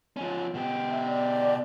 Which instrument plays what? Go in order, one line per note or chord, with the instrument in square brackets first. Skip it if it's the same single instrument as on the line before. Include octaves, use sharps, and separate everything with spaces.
[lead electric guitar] F3 C#4
B2 G4
[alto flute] E5
D5